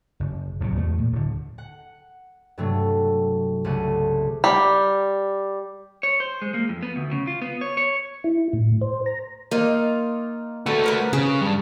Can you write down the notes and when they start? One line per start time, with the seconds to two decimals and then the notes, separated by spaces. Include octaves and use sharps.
0.20 F#1
0.60 D1 B1 G#2 C3
0.77 E2 A3
0.98 A#2
1.12 D1 D3
1.58 F#5
2.58 G2 C3 F#3 A3
3.64 C2 C#3 A3 F#5 D#7
4.44 G3
6.03 C#5
6.20 C5
6.42 G#3
6.54 A#3
6.69 F2
6.83 B3
6.96 D2
7.12 C#3
7.27 F4
7.42 B3
7.61 C#5
7.77 C#5
8.24 E4
8.53 A2
8.81 C5
9.06 A#5
9.51 A#3 D#4 F4
10.66 A3 F#4 A4 B4 A5
10.84 F3 A#4 B4
11.13 C#3 G#4 B4
11.41 G2 G3